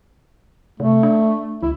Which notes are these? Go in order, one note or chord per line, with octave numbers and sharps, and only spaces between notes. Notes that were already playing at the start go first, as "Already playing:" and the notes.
C3 A3
D4
C#2 E4